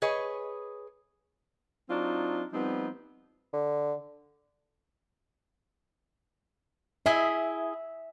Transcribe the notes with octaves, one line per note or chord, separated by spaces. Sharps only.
G#4 B4 C#5 D#5
F#3 C4 D4 D#4 F4
F3 G3 B3 C4 D#4
D3
E4 G#4 D#5 E5